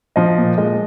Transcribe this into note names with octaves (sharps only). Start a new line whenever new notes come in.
F3 D#5
A#2
G#3 D#5